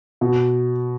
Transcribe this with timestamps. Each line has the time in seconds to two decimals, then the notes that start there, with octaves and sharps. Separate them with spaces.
0.21 B2